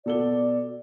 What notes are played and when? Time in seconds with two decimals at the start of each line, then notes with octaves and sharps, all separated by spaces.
0.06 B2 A4 D5 G7